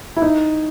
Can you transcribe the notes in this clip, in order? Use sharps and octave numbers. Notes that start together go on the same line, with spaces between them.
E4
D#4